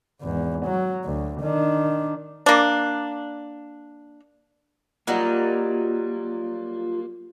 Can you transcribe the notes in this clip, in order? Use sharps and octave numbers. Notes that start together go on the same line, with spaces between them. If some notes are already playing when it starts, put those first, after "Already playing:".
G#1 E2
F#3
D2
D#3 D4
A#3 D4
F#3 G3 A#3 D#4 F4